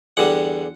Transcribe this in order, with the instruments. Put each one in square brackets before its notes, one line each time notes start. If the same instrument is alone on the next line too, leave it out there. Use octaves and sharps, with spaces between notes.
[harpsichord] E2 D3 G3 F#5